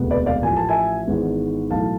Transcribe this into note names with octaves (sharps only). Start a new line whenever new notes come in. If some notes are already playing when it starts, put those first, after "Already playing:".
Already playing: E1 D2 C3 G#3 B3
B4 D5
D5 F5
A1 A2 F3 G#5
A5
E5 G#5
G#1 G#2 E3 G#3 B3
B1 A2 E3 A3 F5 A5